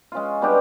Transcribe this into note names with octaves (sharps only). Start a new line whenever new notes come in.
G#3 C#4 F4
G3 B3 D4 G4